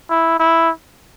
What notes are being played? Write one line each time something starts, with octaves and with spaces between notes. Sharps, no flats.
E4
E4